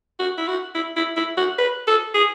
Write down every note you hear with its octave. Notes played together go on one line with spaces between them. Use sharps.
F#4
E4
F#4
E4
E4
E4
F#4
B4
A4
G#4